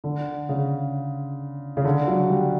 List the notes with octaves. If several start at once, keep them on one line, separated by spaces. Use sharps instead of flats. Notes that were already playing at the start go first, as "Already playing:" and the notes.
D3
C#3
C#3
D3
F#3
G3